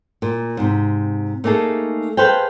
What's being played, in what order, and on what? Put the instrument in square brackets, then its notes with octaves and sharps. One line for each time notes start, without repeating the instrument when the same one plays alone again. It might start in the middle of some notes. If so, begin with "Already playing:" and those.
[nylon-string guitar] A#2
G#2 C3
A3 A#3 D#4 G#4 A4
G#4 A4 B4 C5 F5 G5